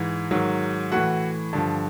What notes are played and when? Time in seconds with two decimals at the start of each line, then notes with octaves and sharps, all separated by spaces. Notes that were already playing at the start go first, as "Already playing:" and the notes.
Already playing: G#2 E3
0.31 G#2 D#3 F#3
0.92 A2 E3 F#4 F#5
1.53 G2 D3 F3